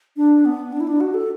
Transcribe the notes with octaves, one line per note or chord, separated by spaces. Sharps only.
D4
B3
D4
E4
D4
F#4
A4